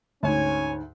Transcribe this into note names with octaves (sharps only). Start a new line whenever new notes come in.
D2 G#2 C#4 C#5 G#5